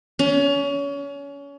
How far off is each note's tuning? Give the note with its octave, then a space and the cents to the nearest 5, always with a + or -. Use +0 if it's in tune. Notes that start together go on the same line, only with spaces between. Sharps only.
C#4 +30